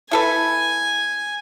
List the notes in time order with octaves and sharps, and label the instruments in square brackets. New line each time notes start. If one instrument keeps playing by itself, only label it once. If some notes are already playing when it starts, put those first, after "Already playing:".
[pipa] E4 A4 B4 [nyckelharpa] G#5